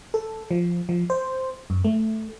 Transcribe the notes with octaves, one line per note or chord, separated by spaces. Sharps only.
A4
F3
F3
C5
F#2
A3